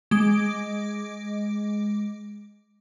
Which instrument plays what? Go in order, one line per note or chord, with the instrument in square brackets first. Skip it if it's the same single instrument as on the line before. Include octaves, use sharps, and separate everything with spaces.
[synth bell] G#3 D6 D7